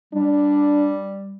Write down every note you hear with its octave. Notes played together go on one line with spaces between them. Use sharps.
G3 D4